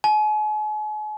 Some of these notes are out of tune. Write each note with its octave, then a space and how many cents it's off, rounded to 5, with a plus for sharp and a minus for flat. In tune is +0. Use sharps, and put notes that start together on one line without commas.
G#5 +40